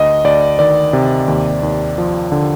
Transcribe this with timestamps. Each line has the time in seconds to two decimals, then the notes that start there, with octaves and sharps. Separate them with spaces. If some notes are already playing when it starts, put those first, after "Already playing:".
Already playing: D2 D#5
0.24 D2 D5
0.59 D#3 D5
0.93 C3
1.28 D#2
1.63 D#2
1.98 F3
2.32 D3